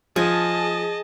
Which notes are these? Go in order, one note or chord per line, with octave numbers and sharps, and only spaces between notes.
F3 G#4 D#5 A5